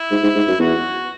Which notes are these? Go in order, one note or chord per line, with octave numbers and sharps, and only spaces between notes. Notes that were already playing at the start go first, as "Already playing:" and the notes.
Already playing: E4
G#2
G#2
G#2
F#2
E2 F#4